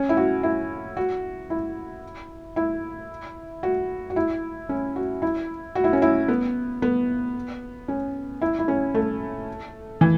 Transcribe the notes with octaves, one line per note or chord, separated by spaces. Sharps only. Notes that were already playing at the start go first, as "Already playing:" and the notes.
Already playing: C#4
E4
F#4
E4
F#4
E4
E4
F#4
F#4
E4
C#4
F#4
E4
F#4
E4
C#4
E4
B3
B3
C#4
E4
E4
C#4
A3
E3